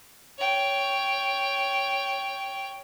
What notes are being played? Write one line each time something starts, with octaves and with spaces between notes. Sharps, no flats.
C#5 G5